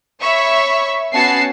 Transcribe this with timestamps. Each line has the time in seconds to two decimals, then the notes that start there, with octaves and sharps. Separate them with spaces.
0.20 C#5 E5 B5 C#6
1.13 B3 C#4 F#4 F#5 A5 C7